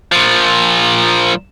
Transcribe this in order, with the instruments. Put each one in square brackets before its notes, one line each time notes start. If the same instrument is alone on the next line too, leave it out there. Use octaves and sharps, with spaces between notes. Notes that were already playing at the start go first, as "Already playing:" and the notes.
[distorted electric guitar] A#2 F3